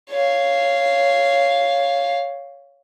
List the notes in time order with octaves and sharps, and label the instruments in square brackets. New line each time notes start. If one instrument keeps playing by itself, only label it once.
[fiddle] C#5 F5